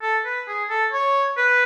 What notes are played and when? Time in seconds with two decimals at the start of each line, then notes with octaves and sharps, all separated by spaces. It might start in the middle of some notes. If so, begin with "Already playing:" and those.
0.02 A4
0.25 B4
0.48 G#4
0.70 A4
0.92 C#5
1.37 B4